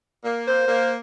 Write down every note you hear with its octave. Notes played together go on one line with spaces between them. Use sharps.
A#3
C5
A#3